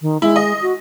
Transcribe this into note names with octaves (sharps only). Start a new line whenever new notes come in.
D#3
G#3 E4
D#5
F#4